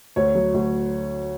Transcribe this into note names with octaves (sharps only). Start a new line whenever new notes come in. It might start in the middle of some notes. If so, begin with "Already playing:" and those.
D2 C#5
F#3
D2